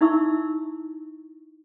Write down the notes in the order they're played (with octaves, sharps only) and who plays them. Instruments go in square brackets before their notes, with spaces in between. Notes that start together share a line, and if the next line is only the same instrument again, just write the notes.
[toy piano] D#4 E4 E5 C#6 E6